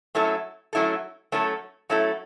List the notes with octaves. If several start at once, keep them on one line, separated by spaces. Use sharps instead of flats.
F#3 A3 C#4 E4 A4
F#3 A3 C#4 E4 A4
F#3 A3 C#4 E4 A4
F#3 A3 C#4 E4 A4